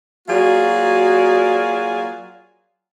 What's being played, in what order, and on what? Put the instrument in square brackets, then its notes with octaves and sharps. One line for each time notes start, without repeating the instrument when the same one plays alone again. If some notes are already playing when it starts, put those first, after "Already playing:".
[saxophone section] F#3 A#3 F4 F#4 G#4 D5